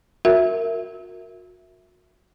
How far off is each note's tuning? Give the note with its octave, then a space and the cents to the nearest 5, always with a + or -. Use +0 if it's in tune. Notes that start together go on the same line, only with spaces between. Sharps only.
F#4 -35 A#4 -10 E5 +0